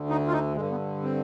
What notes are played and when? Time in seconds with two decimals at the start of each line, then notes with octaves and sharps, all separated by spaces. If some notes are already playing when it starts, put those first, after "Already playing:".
Already playing: D2 D3
0.10 D#4
0.27 F4
0.33 D#4
0.56 G2 D3 G#3
0.71 B3
1.03 C4